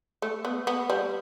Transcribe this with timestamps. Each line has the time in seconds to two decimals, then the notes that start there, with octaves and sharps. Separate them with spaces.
0.22 A3
0.45 B3
0.67 B3
0.90 G3